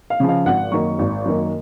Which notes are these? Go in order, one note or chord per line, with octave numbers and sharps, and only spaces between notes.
F5
C#3 F3
F5
G#1 F#5
F#2 D#3 A#3 C#6
G#1
F#2 D#3 A#3